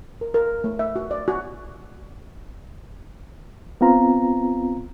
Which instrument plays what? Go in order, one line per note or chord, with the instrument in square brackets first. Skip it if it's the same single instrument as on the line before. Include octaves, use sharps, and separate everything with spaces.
[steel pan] A#4
A#4
A3
E5
F#4
D5
F#4
[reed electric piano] B3 C4 F4 A#5